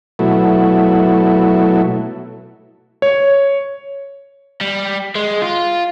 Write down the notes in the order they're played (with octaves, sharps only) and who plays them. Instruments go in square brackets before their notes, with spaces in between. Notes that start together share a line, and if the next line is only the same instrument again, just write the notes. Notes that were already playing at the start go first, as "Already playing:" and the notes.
[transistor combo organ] B2 F#3 A3 E4
[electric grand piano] C#5
[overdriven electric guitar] G3
G#3
F4